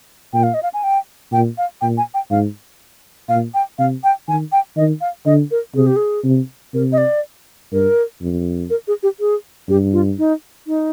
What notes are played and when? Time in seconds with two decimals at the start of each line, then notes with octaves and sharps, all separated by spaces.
0.34 A#2 G5
0.43 F5
0.54 D#5
0.63 F5
0.74 G#5
0.83 G5
1.32 A#2 G5
1.58 F5
1.81 A#2 G5
1.98 G#5
2.14 G5
2.31 G#2 F5
3.29 A#2 F5
3.54 G5
3.79 C3 F5
4.04 G5
4.28 D#3 G#5
4.52 G5
4.76 D#3 D#5
5.01 F5
5.26 D3 D#5
5.51 A#4
5.75 C3 G#4
5.87 G4
5.96 G#4
6.24 C3
6.74 C3 A#4
6.92 D#5
6.98 D5
7.72 G2 A#4
8.21 F2
8.70 A#4
8.88 G#4
9.03 G4
9.20 G#4
9.69 G2 G4
9.93 F4
10.18 D#4
10.67 D#4